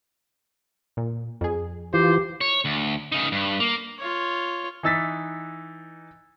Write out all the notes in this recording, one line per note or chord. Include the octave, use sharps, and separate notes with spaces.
A#2
F2 G#4
E3 F4 G4 C5
C#5
D2
C#3 D#4
G2
A#3
F4 C#5
E3 D#4 E6 A6 B6